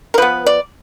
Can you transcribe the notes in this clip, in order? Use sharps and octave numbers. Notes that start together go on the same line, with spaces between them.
A#4
F3 B3 B4
D5